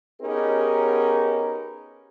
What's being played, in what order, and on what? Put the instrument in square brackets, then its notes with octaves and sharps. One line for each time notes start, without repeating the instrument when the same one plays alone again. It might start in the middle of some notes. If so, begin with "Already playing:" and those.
[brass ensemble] B3 C#4 D#4 G4 G#4 A#4